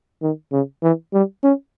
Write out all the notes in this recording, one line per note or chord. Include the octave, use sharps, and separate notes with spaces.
D#3
C#3
E3
G3
C#4